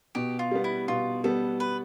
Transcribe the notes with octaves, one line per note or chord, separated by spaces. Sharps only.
B2 G4
F4
G3 B3
E4
B2 F4
G3 B3 A4
B4